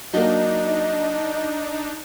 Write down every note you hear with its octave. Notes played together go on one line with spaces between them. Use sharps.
F#3 A#3 D4 D#4 D#5